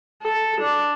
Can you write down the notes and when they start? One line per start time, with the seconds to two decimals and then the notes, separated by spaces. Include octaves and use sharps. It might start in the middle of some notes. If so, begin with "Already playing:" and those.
0.23 A4
0.61 D4